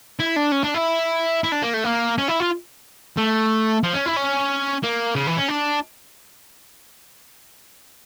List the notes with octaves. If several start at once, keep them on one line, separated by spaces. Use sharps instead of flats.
E4
D4
C#4
D4
E4
E4
D4
A#3
A3
A#3
C#4
E4
F4
A3
F3
C#4
E4
C#4
A#3
C#3
E3
C#4
D4